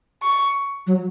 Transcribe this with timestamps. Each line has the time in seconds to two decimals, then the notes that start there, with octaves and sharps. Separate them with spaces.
0.22 C#6
0.87 F#3